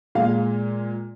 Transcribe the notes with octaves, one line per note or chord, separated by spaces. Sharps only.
A#2 G#3 F5